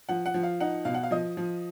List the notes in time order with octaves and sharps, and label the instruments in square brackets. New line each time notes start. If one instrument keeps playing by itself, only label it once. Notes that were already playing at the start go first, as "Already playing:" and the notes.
[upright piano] F3 F#5
F#5
F3
F5
D#4 F#5
B2 F5
F#5
F5
F3 D#5
F3